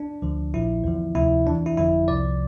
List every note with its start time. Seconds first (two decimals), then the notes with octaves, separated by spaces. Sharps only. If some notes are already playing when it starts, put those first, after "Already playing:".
Already playing: D4
0.22 D2 D3 F3
0.54 A#1 A#2 F3 E4
0.84 E2 D3 F3
1.15 D2 C3 F3 E4
1.46 E2 D4
1.49 E3
1.66 E4
1.77 G1 F2 D3 F3 E4
2.08 C2 C3 F3 D5